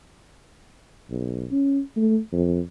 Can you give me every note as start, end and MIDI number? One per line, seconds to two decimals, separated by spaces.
1.10 1.46 35
1.51 1.80 61
1.97 2.18 57
2.33 2.60 41